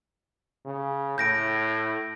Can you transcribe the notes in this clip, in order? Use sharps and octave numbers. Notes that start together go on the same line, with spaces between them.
C#3
A2 G6 A#6 D7